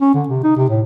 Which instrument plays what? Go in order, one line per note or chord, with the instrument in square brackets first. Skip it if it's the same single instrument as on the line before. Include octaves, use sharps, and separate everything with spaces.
[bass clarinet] C#4
D3
C3
D#4
C3
A2